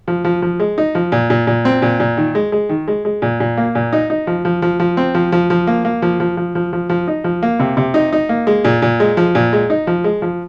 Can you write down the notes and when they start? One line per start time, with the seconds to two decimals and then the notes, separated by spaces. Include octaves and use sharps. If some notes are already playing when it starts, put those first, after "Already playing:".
0.08 F3
0.25 F3
0.42 F3
0.60 G#3
0.78 D#4
0.95 F3
1.12 A#2
1.30 A#2
1.47 A#2
1.65 C4
1.82 A#2
2.00 A#2
2.17 D#3
2.35 G#3
2.52 G#3
2.69 D#3
2.88 G#3
3.05 G#3
3.22 A#2
3.40 A#2
3.57 A#3
3.75 A#2
3.93 D#4
4.10 D#4
4.27 F3
4.45 F3
4.62 F3
4.80 F3
4.97 C4
5.15 F3
5.32 F3
5.50 F3
5.67 A#3
5.85 A#3
6.02 F3
6.20 F3
6.37 F3
6.55 F3
6.73 F3
6.90 F3
7.08 D#4
7.24 F3
7.43 A#3
7.60 C3
7.77 C3
7.94 D#4
8.13 D#4
8.29 A#3
8.47 G#3
8.65 A#2
8.82 A#2
9.00 G#3
9.17 F3
9.35 A#2
9.53 G#3
9.70 D#4
9.87 F3
10.04 G#3
10.22 F3